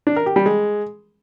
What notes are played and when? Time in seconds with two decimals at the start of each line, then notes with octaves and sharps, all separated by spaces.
0.07 D4
0.16 A#4
0.26 G4
0.36 G3
0.46 G#3